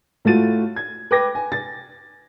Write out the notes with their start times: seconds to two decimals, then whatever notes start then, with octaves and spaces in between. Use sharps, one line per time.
0.25 A2 A3 F4 F#4 A6 D#7
0.76 G#6
1.11 B4 G5 D6 G#6 A#6
1.35 G#5
1.52 A6